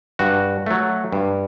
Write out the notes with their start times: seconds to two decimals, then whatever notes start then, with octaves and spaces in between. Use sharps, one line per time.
0.19 G2 F#4
0.66 F#3 A3
1.12 G2